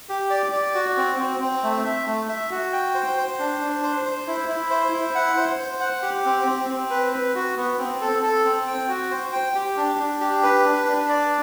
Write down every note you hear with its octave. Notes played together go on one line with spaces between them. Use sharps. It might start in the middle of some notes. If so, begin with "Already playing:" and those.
G4
D5
D5
F#4
C4
C4
C4
A3
E5
A3
E5
F#4
G5
C5
C5
D4
D4
C5
C5
E4
E4
C5
E4
F#5
C5
C5
F#5
G4
C4
C4
C4
B4
B4
F#4
B3
C4
A4
A4
C4
G5
F#4
C5
G5
G4
D4
D4
G4
B4
D4
D4
D5